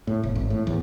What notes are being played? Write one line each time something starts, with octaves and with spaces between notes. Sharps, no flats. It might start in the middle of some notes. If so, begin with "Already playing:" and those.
A2
E1
G#1
A2
E2